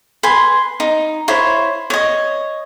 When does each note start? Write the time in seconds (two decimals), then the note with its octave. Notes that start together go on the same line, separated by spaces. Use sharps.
0.23 B4 G#5 C6
0.80 D#4
1.28 E4 C5 C#5
1.90 C#5 D#5